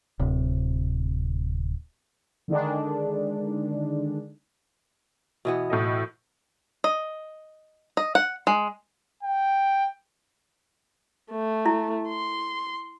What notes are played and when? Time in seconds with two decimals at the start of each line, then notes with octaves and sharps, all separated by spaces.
0.19 D1 C3
2.48 D3 D#3 G#3 D4
5.45 B2 E3 B3
5.70 A2 A4 D#5
6.84 D#5
7.97 D#5
8.15 F#5
8.47 G#3
9.23 G5
11.31 A3
11.66 E4
12.08 C6